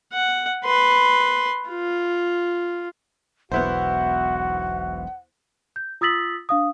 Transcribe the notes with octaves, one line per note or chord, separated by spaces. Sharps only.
F#5
B4 C6
F4
E1 B1 B3 E4 F#4 C5 F#5
G6
F4 D#6 E6 A6 B6 F#7
D4 F5 D#6